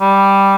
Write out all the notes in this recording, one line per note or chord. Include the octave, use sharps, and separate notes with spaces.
G3